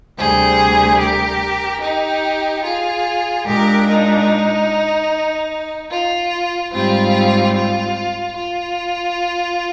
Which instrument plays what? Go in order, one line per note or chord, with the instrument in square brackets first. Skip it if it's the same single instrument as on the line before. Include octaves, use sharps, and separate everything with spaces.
[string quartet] D2 C3 G3 G#4 C5
G4 A#4
D#4 G4
F4 G#4
A#2 G#3 D4 G4 A#4
D#4
F4
G#2 G3 C4 F4
F4
F4